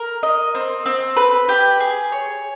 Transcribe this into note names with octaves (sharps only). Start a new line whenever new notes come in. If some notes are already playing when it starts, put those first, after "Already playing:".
Already playing: A#4
D#5
C4
C4
B4
G4
G#4
C#5